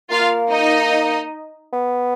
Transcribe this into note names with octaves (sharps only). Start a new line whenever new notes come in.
A#3 F4 F5
D#4 D#5
B3